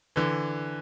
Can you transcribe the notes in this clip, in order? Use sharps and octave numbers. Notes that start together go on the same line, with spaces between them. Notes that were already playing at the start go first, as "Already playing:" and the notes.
D3 E3